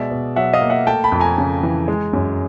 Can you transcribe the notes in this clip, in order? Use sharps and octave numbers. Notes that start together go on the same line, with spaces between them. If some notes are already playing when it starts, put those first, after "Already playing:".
Already playing: B2 G#3 D5 E5
B2
F#3 E5 F#5
D#5 F5
A#3
E5 F#5
A3 G5 A5
A5 B5
F2
G#5 A#5
C#3
E3
G#3
F#2